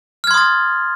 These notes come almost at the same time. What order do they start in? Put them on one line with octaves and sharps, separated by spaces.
F6 G#6 C6 D#6 A6